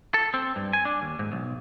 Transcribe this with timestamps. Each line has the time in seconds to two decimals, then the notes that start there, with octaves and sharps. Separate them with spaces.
0.14 A4
0.34 C4
0.56 G2
0.73 G#5
0.85 D4
1.02 D#2
1.19 G#2
1.32 B1